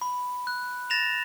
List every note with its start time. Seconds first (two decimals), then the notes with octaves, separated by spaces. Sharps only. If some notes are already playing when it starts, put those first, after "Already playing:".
0.01 B5
0.47 F#6
0.90 A6 A#6 E7 F7